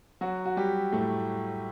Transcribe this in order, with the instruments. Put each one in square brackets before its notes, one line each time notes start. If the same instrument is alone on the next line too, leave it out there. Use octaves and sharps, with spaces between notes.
[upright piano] F#3 F#4
F#4
G3 G4
A2 A3